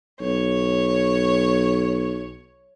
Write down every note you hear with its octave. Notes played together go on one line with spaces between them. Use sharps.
B1 C#5